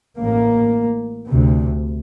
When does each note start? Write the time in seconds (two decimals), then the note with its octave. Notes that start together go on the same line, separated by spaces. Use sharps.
0.20 A1 A2 A#3
1.28 D2 C3